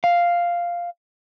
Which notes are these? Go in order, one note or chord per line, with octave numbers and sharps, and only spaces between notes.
F5